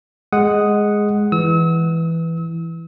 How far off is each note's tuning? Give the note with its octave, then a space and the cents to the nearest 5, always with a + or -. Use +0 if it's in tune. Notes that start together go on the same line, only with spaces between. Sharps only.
G#3 +0 F#5 +0 D#6 +0
E3 +0 E6 -40